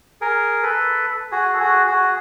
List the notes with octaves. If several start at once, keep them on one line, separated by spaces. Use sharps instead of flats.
G#4 A#4
A4 B4
F#4 G#4
A4
F#4 G#4
F#4 G#4